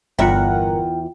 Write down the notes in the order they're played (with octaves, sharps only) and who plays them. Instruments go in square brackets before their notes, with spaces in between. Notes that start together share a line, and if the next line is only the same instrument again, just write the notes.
[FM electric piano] G1 A#4 F#5 [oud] E2 E5 [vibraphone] F4 G5